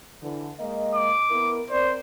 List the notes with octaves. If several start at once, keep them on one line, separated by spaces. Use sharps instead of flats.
D3 E3
G#3 A#3 D#5
D6
B3 E4 A#4
C4 A#4 C5 D5